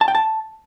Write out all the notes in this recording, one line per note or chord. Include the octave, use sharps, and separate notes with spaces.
A5
G5
A5